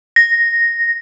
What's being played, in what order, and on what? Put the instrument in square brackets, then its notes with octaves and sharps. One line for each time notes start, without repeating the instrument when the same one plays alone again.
[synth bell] A#6